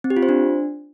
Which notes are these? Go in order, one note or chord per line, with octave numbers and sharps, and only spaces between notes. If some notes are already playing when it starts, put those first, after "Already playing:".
C4
G4
F4
C5
D4